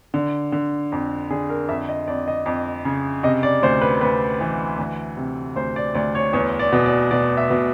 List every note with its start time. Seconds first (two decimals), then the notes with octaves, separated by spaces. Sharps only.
0.14 D3
0.52 D3
0.92 F2
1.30 D3 G#4
1.50 A#4
1.69 F2 E5
1.89 D#5
2.07 F2 D5
2.28 D#5
2.46 F2
2.85 C#3
3.23 C3 D#5
3.43 D5
3.62 D2 C5
3.81 B4
4.01 D2 B4
4.41 E3
4.79 D2
5.17 C3
5.56 D2 C5
5.76 D5
5.95 D2 D5
6.15 C#5
6.33 E2 C#5
6.59 D5
6.72 B2
6.86 D5
7.11 B2 D5
7.37 E5
7.50 B2